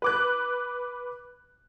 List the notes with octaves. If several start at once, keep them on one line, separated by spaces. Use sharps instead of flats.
B4 D6 F#6